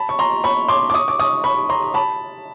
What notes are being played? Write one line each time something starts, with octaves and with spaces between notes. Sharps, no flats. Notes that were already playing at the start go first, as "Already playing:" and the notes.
Already playing: A5 B5
C#6
A#5 C6
B5 C#6
C6 D6
D6
C#6 D#6
D6
C#6 D#6
B5 C#6
A#5 C6
A5 B5